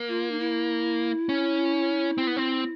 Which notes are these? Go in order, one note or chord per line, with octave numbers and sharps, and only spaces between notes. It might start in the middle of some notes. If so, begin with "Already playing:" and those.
Already playing: A#3
F4
D#4
E4
C#4
C4
B3
C4